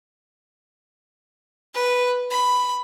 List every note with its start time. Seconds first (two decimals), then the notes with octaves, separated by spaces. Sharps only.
1.74 B4
2.30 B5